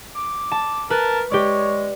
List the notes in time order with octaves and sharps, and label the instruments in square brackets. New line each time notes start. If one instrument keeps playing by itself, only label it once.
[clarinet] D6
[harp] A5
[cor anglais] A#4 [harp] B4 [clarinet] A5
[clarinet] G#3 [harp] G4 D5 [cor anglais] C#5